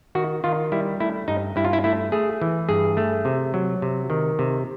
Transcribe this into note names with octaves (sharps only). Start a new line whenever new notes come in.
D#3 F#4
D#3 F4
G3 E4
A3 E4
G2 D#4
G2 E4
F4
E4
A3 E4
A3 G#4
E3
G2 G#4
A3
C3
F#3
C3
D#3
C3